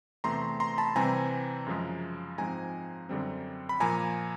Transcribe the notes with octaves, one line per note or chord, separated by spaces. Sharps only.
E2 C3 E3 A3 C4 A#5 C6
A#5 C6
A5 B5
C3 E3 G3 C4 G#5 A#5
F#2 C#3 F3 G#3
G#2 F3 G#3 C4 G#5 A#5
F#2 D3 G3 C4
B5
A#2 F3 A#3 G#5 A#5